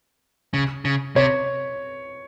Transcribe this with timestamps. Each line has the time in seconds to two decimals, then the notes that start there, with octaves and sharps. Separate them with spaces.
0.54 C#3
0.85 C#3
1.16 C3 C#5